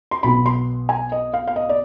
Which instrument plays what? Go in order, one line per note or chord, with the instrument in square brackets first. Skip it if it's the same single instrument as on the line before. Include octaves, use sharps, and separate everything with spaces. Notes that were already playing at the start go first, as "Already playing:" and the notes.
[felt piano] C6
B1 B2 B3 B5
C6
G#5
D#5
F5
F5
D#5
D5